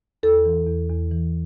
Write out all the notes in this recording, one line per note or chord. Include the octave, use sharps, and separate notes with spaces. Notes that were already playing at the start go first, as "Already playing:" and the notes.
E2 A4
E3
E2
E2
E3